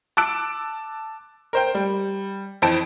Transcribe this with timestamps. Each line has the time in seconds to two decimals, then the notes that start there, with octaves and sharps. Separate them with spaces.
0.17 A5 D6 E6 F#6 D7
1.53 A#4 C5 G5
1.75 G3
2.62 F2 E3 C5 A5 D7